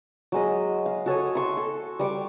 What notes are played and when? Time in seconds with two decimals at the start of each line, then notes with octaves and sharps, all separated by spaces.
0.32 F#3 G#3 D#5
0.86 F5
1.06 F#4 A4 C#5 D#6
1.35 C6 C#6 E6
1.57 A4
1.99 G3 C#6 D6